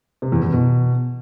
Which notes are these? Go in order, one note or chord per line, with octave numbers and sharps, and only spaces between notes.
C3
E2
E2
B2